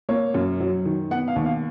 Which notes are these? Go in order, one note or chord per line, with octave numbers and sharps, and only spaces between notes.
A#3 C#5
F#2
F#3
D#3
B3 F#5
F5
D#2
F5